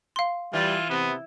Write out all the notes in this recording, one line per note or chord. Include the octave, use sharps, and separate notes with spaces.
F5 C6
E3 G3 F4
C3 B3